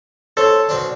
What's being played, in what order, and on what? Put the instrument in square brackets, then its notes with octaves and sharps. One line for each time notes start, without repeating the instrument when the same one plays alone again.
[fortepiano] A4 [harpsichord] C5 C#5
[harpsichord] B1 C4 D4